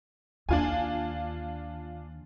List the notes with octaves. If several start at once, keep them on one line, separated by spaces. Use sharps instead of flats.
D#2 D4 F4 G#5